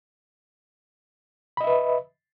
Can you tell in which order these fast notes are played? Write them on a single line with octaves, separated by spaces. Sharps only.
B5 D#5 E5 B4